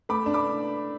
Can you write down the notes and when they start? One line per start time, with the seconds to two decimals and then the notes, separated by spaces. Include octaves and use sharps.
0.09 A3 B5 D6
0.26 D4
0.34 B5 D6